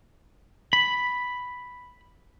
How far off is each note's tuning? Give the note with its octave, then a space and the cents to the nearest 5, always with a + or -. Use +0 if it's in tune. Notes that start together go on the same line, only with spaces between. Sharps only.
B5 +0